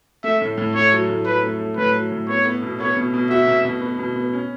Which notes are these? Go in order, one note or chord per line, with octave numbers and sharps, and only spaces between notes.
A3 E5
A2
A2
A3 C#5
F#3
A2
F#3 B4
A3
A3
A2 B4
F#3
A2
B3 C#5
B3
B2
B3 C#5
B2
B2
F#4 E5
B2
B2
B3
B2
B3
C#4